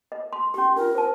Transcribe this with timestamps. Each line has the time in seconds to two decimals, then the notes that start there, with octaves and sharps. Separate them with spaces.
0.12 D#5
0.33 C6
0.54 C#4 G4 C6
0.76 D4 F4 A#4
0.95 C5 A5